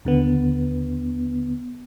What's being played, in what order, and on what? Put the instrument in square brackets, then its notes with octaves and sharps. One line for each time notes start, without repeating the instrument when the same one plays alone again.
[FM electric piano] D#2 D3 B3